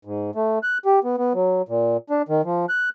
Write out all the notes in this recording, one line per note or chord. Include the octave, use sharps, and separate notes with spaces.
G#2
A3
F#6
G4
B3
B3
F#3
A#2
D4
D#3
F3
F#6